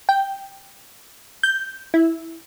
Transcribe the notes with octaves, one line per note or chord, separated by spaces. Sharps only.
G5
G6
E4